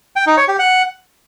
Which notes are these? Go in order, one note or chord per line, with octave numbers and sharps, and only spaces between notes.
G5
D#4
C#5
G4
F#5